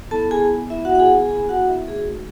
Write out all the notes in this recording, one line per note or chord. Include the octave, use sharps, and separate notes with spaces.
B3 E4 A4 A5
G#4 G#5
B3 E4 E5
F#4 F#5
F#5
G#4 G#5
G#4 G#5
B3 E4 G#4 G#5
F#4 F#5
E4 E5
A3 D#4 F#4 G#4